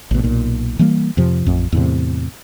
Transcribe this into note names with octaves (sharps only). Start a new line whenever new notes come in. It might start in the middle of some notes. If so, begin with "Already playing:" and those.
A1 B2
B1 A#2
E3 G3 A#3
F2 C3 F3
A1 F2
E2 A2 C3